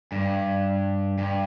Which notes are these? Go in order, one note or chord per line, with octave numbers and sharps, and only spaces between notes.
G2
G2